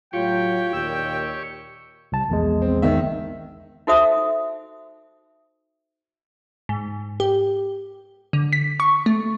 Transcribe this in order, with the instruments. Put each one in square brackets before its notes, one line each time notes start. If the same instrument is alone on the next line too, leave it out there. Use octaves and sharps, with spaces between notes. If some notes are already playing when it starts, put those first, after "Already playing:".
[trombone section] A2 F#3 [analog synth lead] F4 [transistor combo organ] G4 C#5 [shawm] G5
[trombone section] D#2 A#2 [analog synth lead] E6
[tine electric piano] C2 A5
A#1 E2 G#3
[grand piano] C4
D#3 E5
[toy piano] D#4 F#4 A4 C5 E5 D#6
[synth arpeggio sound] G#2
G4
D3
B6
C#6
A3